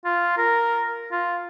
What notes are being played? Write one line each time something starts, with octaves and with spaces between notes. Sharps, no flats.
F4
A#4
F4